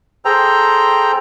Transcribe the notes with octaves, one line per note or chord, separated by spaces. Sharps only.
G#4 A4 C5 G5 A#5